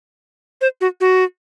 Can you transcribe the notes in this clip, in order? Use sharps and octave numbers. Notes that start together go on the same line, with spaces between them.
C5
F#4
F#4